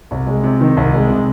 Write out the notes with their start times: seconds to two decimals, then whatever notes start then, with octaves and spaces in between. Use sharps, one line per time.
0.11 C2
0.26 G#3
0.43 C3
0.60 D#3
0.77 C2
0.93 G#3
1.10 C3